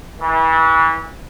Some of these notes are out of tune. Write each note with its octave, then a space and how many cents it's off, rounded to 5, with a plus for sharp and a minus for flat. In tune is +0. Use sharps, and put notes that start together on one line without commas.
E3 -30